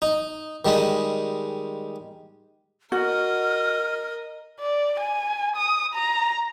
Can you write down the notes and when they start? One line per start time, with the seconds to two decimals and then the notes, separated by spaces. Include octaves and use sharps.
0.02 D#4
0.65 D#3 G3 G#3 B5
2.92 F#4 A#4 D#5 F6
4.60 D5
5.00 G#5
5.57 D#6
5.94 A#5